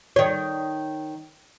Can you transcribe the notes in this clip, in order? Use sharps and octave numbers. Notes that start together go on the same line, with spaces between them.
D#3 C#5